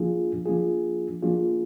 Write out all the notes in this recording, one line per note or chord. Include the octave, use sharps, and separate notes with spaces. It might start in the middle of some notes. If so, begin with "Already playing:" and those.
Already playing: F3 A#3 D4 F4 G#4
F3 A#3 D4 F4 G#4
F3 A#3 D4 F4 G#4